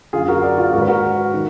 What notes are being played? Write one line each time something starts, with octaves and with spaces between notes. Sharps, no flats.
F#2 D3 F4 G#4
F#4 A#4
A#4 D5
F4 G#4
G#2 D#3 F#4 A#4
B4
F#4 A#4
D#3